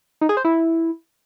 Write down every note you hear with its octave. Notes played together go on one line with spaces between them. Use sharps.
D#4
G#4
C5
E4